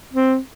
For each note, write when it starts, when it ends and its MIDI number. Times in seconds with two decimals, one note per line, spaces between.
0.13 0.37 60